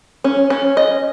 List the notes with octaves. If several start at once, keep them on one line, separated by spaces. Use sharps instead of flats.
C#4
C#4
D#5